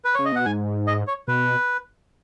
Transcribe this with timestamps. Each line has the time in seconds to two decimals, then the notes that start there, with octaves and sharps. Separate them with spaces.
0.05 B4
0.15 C#3 C#5
0.25 D#5
0.32 B2 F#5
0.45 G#2 G#5
0.87 D#5
1.07 C#5
1.28 B2 B4